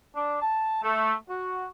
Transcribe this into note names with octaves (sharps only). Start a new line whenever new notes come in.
D4
A5
A3
F#4